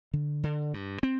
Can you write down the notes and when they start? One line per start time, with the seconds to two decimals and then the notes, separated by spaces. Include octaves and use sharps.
0.13 D3
0.43 D3
0.74 G2
1.03 C4